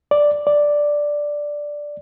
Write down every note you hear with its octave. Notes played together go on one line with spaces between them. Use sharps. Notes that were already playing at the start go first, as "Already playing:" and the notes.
D5
D5